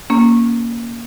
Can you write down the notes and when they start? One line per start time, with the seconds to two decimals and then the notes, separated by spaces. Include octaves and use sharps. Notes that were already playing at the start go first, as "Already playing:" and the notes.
0.10 A#3 C#4